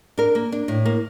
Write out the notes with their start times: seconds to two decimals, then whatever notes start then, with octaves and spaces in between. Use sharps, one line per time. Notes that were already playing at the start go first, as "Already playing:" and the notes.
0.18 D4 A#4
0.35 A#3
0.52 D4
0.68 A2
0.85 A#3